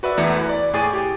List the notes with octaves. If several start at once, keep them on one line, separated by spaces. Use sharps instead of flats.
F#4 B4 D5 E5
E2 E3 A3 E4 A#5 C#7
B4
D5
A2 G#4 D6 A6 D#7
G4